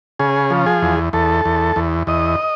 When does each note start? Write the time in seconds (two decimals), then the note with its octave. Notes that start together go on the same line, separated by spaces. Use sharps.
0.19 C#3 G#4
0.50 F3
0.66 G#4
0.82 E2
1.13 E2 A4
1.45 E2
1.76 E2
2.07 E2 D#5